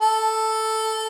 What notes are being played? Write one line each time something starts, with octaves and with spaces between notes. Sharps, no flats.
A4